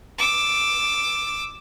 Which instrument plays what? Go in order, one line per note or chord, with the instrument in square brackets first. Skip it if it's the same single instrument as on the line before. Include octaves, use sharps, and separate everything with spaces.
[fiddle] D6 E6